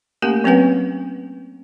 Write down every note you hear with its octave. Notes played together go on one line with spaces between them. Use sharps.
A3 A#3 C#4 G4 A#4 G#5
F#3 C4 C#4 B4 F#5